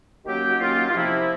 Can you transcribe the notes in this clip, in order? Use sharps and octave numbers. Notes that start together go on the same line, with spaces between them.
D#3 F#3 A#3 C#4 G4
F#4
D#3 F#3 A#3 C#4 F4
F4
C3 F3 A#3 E4